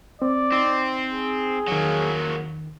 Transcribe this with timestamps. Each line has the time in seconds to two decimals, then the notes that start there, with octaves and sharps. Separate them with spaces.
0.22 C4 D5
0.52 C4 D#4
1.10 G#4
1.68 E2 D#3 F#3 A#3